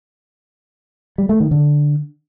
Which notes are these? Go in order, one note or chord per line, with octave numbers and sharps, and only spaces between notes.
G3
A3
D#3
D3